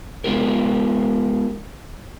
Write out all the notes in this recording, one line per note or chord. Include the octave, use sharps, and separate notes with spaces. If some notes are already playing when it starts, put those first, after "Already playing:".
G#3 B3 F4 G4 A#4